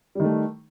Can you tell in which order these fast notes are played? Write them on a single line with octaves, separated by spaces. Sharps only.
G3 D#3 A3